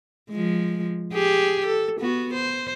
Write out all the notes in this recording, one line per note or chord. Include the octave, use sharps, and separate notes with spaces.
F3 G#3
G4 G#4
A4
B3 F#4
C5